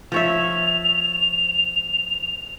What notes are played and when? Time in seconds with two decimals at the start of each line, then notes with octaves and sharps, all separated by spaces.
0.12 F3 C#5 E5 F7